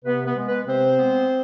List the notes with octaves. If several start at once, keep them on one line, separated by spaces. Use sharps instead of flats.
C3 B3 B4
B3 B4
G#3 B3
B3 B4
C3 C4 C5
G#3 B3